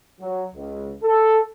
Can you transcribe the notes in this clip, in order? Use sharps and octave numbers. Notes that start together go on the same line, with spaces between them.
F#3
C#2
A4